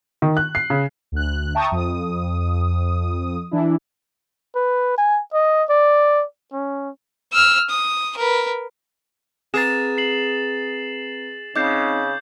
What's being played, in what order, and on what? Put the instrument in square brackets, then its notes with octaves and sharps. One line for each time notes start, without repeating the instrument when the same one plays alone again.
[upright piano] D#3
F#6
C7
C#3
[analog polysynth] D2 F#6
E5 G5 A5 A#5 C#6 D#6
F2 D#6
E3 D4 E4
[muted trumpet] B4
G#5
D#5
D5
C#4
[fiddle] E6 F6
D#6
A#4 B4
[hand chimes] C4 B4 A#5 [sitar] G#4 [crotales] A6 E7
[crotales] C7 F#7
[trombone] C#3 [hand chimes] C4 D#4 D#5 [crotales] D6 G6 C7